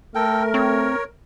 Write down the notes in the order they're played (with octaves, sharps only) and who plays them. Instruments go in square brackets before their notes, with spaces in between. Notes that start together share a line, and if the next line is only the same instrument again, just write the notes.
[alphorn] A3 [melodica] A4 G5 [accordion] A#4
[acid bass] C4 [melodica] C#5